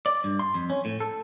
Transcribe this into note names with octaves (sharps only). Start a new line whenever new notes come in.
D5
G2
C6
F2
C#4
A2
A4